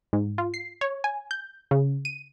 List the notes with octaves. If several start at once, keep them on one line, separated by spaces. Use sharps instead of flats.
G#2
F4
C7
C#5
G#5
G6
C#3
D#7